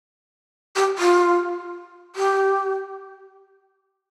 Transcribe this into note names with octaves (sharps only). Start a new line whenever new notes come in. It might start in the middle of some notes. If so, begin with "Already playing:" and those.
G4
F4
G4